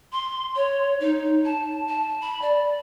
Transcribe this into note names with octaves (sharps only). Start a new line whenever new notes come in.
C6
C#5
D#4
A5
A5
B5
D5